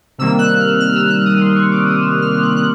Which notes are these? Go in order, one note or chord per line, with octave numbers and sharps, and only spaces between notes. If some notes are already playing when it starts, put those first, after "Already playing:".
C3 D#3 G3 A#3 E6
F#6
F6
F6
E6
F#6
D#6
C6
C#6
D6
D#6
E6
F6
F6
F#6
F#6